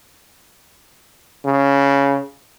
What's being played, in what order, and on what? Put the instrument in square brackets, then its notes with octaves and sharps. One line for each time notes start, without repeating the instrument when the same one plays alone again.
[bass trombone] C#3